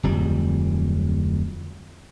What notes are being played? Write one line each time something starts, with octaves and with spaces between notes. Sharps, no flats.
D1 F2 G3